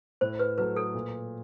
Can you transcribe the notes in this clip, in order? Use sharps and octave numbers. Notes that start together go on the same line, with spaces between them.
A2 C5
B4
F#3 A3 B4
A4
A#2